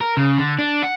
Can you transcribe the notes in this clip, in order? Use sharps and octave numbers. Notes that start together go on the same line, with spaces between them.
A#4
C#3
D3
D4
F#5